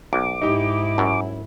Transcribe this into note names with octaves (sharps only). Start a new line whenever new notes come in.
B1 D6
G#2 D#4 E4 G4
F#2